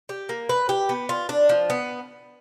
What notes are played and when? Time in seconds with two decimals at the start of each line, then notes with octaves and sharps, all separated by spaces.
0.09 G4
0.29 A#3
0.49 B4
0.69 G4
0.89 B3
1.09 F4
1.29 D4
1.49 F3
1.70 B3